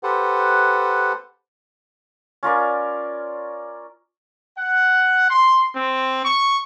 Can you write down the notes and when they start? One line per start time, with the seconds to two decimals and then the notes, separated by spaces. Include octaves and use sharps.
0.03 G4 A4 B4 C5 F#5
2.43 C#4 F4 A#4 D5
4.57 F#5
5.29 C6
5.75 C4
6.24 C#6